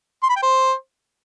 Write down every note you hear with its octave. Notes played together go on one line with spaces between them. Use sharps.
C6
B5
G5
C5